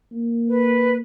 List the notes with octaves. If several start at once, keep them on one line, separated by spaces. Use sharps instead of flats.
A#3
B4